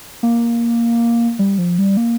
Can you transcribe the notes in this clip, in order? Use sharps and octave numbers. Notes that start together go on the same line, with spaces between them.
A#3
G3
F3
G3
A#3